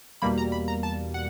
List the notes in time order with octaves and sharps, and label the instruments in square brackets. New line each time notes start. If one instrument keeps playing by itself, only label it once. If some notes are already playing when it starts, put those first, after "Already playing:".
[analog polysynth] E2 B2 G3 A#3 B5
A#5
B5
A#5
A5
F#5